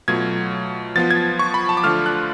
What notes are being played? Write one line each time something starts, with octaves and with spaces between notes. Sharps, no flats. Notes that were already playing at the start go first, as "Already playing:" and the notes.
B2 F#3 A3 F4 G#6
F3 B3 F4 A6
G#6
C#6
B5
A5
D6
D3 F3 A3 F4 F6
F#6